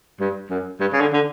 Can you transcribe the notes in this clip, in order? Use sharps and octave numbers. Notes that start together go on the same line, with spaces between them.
G2
F#2
G2
C#3
D3
D3